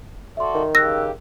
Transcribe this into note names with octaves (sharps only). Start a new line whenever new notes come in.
F#4 A4 D5 E5 C6
D#3
C#3 G4 E6 F#6 A#6